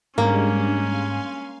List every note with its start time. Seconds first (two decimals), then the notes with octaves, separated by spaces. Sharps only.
0.18 G#2 G3 G#3 A#3 C#4 D4
0.76 F5 G#5 C6